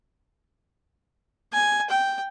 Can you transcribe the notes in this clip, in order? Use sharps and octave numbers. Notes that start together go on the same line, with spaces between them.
G#5
G5